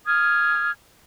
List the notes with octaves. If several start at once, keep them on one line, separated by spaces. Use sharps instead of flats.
D#6 F6 G#6